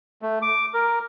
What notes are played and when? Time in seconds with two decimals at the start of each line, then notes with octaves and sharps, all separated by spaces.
0.22 A3
0.42 D6
0.74 A#4